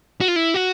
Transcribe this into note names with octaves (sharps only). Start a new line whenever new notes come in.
F#4
F4
E4
F#4